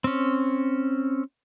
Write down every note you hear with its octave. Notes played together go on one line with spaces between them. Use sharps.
C4 C#4